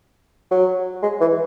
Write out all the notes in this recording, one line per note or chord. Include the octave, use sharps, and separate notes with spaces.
F#3
G#3
E3